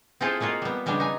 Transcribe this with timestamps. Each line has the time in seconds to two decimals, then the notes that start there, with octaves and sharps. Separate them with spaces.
0.21 C4 E4 F4 G#4 A4 C5
0.40 G#3 A#3 F4 F#4
0.62 G3 B3
0.86 C#3 G3 G#3 B3 D4
1.00 D#4 G#5